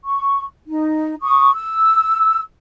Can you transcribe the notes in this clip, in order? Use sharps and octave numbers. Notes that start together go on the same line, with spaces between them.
C#6
D#4
C#6 D#6
E6